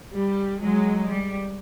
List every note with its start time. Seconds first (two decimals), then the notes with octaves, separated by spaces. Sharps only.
0.15 G3
0.61 F#3 G#3
1.08 G3